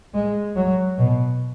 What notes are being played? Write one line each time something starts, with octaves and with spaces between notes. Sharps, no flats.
G#3
F#3
B2